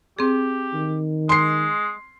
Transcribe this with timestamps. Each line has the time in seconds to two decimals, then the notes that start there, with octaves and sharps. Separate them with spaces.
0.19 C4 G4 G#4
0.74 D#3
1.29 G#3 C6 C7